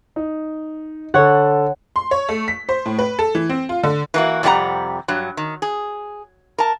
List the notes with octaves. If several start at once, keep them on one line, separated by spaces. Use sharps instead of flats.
D#4
D3 A4 C#5 F#5
C6
C#5
A3
B6
C5
A2
B4
A4
E3
C4
F4
D3
E3 A#3 F#4
F2 C3 G3 E4 F#5 A#5
G2 F#3
D#3
G#4
A#4 A5